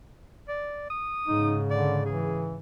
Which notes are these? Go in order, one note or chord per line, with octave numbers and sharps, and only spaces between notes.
D5
D#6
G#2 C#3 D#4
D3 D5
E3 G#4